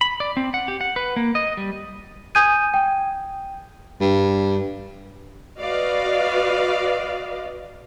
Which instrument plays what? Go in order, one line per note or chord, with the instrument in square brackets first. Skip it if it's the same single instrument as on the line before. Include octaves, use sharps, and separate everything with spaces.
[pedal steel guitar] B5
D5
C4
F#5
G4
F#5
B4
A#3
D#5
G3
[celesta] G#5 D#6 G6 G#6 D#7
G5
[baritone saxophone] G2
[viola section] F#4 B4 D5 D#5 F5